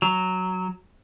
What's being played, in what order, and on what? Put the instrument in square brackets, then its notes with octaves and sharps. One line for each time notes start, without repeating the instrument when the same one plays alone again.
[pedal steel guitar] F#3